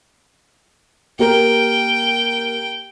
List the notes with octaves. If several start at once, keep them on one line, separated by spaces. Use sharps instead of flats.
A#3 G4 A#4 G5